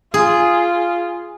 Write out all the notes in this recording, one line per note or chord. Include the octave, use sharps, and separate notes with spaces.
F4 G#4